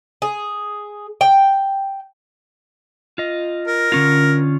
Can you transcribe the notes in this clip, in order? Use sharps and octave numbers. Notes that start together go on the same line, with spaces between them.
G#4
G5
F4 D#5
A#4
D3 C#4 F4